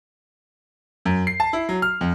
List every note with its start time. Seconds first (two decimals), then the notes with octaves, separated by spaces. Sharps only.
1.05 F#2
1.27 C7
1.40 A5
1.53 E4
1.69 F#3
1.82 F6
2.01 F2